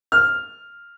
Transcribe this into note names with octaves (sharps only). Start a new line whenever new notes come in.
F6